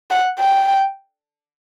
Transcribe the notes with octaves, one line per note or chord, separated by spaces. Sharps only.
F#5
G5